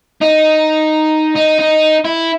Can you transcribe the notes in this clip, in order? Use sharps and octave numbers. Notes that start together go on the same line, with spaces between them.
D#4
D#4
D#4
E4